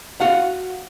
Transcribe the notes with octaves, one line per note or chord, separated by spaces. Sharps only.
F#4 F5 F#5